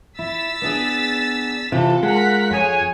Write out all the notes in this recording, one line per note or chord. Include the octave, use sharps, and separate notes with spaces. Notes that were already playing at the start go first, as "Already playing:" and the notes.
E4 E6 A6 B6
B3 D4 G#4
C3 E3 F4 A4
G#3 A#4 F#5 B6
F2 G#4 C#5 F#5 G#5